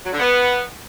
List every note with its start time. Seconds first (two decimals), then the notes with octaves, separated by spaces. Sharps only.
0.05 F#3
0.12 D3
0.19 B3